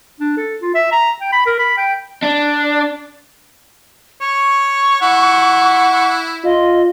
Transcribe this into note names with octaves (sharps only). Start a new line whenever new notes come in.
D4
A4
F4
E5
A#5
G5
B5
A#4
B5
G5
D4
C#5 C#6
E4 F#5
F4 D#5